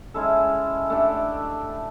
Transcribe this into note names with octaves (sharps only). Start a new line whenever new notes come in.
G#3 C#4 E4 A4
A3 D4 G4